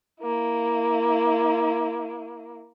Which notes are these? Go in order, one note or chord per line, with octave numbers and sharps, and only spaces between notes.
A#3 E4